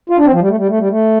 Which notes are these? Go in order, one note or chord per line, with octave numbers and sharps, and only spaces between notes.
F4
D4
C4
F3
G3
A3
G3
A3
G3
A3